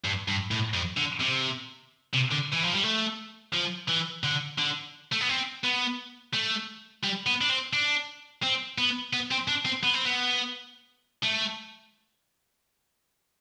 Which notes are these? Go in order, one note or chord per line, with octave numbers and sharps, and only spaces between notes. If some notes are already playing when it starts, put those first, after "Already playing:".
G2
G2
A2
F2
D3
C3
C3
D3
E3
F3
G3
A3
F3
E3
D3
D3
A3
B3
C4
B3
A3
G3
B3
D4
C4
D4
C4
B3
B3
C4
D4
C4
B3
C4
B3
A3